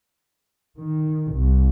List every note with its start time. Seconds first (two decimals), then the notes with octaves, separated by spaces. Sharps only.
0.78 D#3
1.34 C2